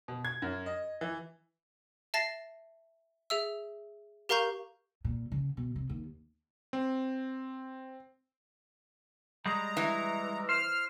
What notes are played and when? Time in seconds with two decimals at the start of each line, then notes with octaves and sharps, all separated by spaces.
0.08 B2
0.25 G#6
0.42 F#2
0.66 D#5
1.01 E3
2.14 E5 A5 A6 A#6 C7
3.30 G#4 E5 E6
4.29 G4 A#4 F5 A#5 C#6 G6
5.04 A#2
5.32 C#3
5.57 B2
5.76 C3
5.89 D#2
6.73 C4
9.46 G3 G#3 A#5
9.77 E3
10.49 C5 F6